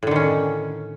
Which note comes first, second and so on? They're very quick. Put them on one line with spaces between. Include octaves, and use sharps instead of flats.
A2 D3 D#3 C#4